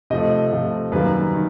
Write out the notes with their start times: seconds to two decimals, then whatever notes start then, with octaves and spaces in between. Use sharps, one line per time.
0.10 C3 F3 A3 D#5
0.52 C3 F3 A3
0.92 F#2 D#3 G3 A#3 B4
1.34 D#3